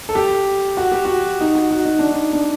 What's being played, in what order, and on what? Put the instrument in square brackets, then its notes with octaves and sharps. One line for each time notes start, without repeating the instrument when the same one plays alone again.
[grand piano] A4
G4
F#4
G4
F#4
D#4
F#4
F#4
D#4
D4
D#4
D4